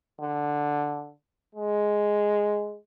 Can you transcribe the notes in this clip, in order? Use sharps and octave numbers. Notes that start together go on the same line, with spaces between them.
D3
G#3